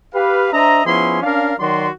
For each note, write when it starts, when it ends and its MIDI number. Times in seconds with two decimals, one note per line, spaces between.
0.15 0.48 67
0.15 0.48 71
0.15 0.48 77
0.52 0.84 62
0.52 0.84 72
0.52 0.84 75
0.52 0.84 76
0.52 0.84 82
0.86 1.21 53
0.86 1.21 59
0.86 1.21 61
0.86 1.21 64
0.86 1.21 68
0.86 1.21 84
1.22 1.54 61
1.22 1.54 62
1.22 1.54 70
1.22 1.54 74
1.22 1.54 77
1.60 1.88 51
1.60 1.88 54
1.60 1.88 66
1.60 1.88 74
1.60 1.88 84